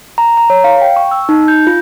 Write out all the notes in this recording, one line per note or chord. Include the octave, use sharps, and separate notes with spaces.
A#5
A#5
C#5
F5
G5
C#6
E6
D#4
G6
F4